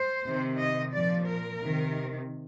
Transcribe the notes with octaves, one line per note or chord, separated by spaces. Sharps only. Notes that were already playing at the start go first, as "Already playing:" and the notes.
Already playing: C5
C3 D#3
D#5
A#2 F3 D5
A#4
C3 D#3